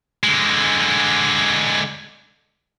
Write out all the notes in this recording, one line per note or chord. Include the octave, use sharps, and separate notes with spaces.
D3 G#3